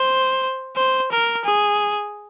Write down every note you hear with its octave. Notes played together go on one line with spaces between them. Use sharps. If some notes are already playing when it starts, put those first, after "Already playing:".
Already playing: C5
C5
A#4
G#4